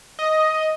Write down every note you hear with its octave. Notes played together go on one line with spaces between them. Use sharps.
D#5